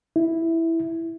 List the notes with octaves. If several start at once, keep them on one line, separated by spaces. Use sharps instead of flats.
E4